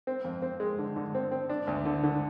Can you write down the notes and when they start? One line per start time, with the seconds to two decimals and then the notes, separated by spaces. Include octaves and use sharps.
0.07 C4
0.24 F2
0.42 C4
0.60 G#3
0.79 D3
0.96 D3
1.15 C4
1.32 C4
1.49 D4
1.67 D2
1.85 D3
2.03 D3